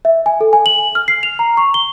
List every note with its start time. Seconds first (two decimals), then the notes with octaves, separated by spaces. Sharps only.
0.05 E5
0.26 G#5
0.41 A4
0.53 G#5
0.66 F#7
0.95 F6
1.08 C7
1.23 F7
1.39 A#5
1.57 C#6
1.74 G7